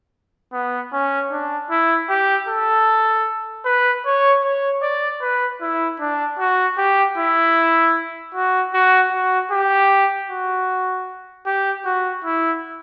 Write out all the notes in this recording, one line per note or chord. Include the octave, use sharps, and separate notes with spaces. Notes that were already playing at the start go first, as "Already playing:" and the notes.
B3
C#4
D4
E4
G4
A4
B4
C#5
C#5
D5
B4
E4
D4
F#4
G4
E4
F#4
F#4
F#4
G4
F#4
G4
F#4
E4